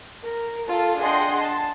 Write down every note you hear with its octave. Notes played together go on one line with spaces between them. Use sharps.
A#4
F4 A4
D4 G#4 D#5 F#5 G5 C6
A5